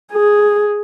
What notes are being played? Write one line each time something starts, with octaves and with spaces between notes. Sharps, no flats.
G#4